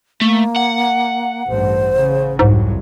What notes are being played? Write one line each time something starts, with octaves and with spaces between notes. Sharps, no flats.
A3 A#3
F#5
A1 G2 C5
C#3
C2 F2 G#2 F#3